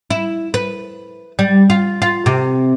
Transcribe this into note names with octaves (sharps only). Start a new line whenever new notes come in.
E4
B4
G3
F4
F4
C3